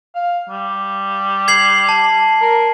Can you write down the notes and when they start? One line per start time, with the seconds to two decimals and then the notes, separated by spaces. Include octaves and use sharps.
0.15 F5
0.49 G3
1.48 G#6 C7 F#7
1.89 A5
2.41 A#4